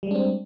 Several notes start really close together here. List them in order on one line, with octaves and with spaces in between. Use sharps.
G3 G#3 D4 C4